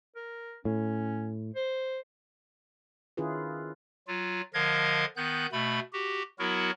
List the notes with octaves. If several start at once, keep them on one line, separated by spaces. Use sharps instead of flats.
A#4
A2 C#4
C5
D#3 C#4 E4 F4 G#4 B4
F#3 F4
D3 F3 A#4 D#5 F5 G#6
D#3 B3 F#6 G6
B2 A3 B5
F#4 G4
F#3 B3 E4 F#4 A#4